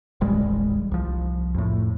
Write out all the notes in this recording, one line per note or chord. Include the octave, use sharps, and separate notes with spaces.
D#1 A1 G3 G#3
C2 F3
F2 A2